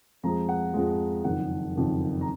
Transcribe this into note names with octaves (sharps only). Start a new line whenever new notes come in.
F2 F3 G#3 A#5
F#5
F2 F3 G#3
F#1 F2 D#3 F#5
F#1 F2 D#3
A#5